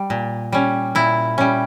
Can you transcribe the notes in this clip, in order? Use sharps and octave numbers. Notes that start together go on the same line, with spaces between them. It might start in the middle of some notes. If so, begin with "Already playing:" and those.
Already playing: G3
A#2
G3 C#4
A#2 E4
G3 C#4